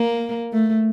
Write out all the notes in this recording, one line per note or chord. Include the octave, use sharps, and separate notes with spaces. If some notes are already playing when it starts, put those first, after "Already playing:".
Already playing: A#3
A3